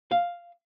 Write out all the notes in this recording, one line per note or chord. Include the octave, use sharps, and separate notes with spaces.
F5